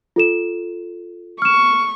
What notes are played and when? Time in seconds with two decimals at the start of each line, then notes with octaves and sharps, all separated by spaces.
0.16 F4 A4 E7
1.42 C#6 F6 E7